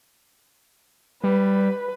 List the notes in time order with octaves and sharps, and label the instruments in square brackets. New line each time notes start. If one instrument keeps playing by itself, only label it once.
[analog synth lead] G3 [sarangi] B4